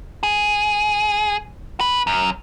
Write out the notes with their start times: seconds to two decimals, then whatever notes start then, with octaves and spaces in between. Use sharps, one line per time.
0.23 G#4
1.81 B4
2.07 F#2